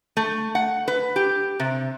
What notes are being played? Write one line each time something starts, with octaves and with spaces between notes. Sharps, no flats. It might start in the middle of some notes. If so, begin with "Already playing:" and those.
A3
F#5
B4
G4
C3